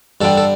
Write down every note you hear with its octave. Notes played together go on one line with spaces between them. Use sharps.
G2 D3 G3 A4
A4